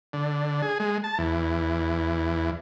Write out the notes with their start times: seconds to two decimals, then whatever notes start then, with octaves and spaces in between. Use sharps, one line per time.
0.13 D3
0.62 G#4
0.80 G#3
1.04 A5
1.18 E2